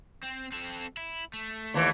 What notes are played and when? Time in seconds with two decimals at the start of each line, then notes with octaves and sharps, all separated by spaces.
0.23 C4
0.52 C4 A4
0.97 E4
1.33 A3
1.74 D#2 E3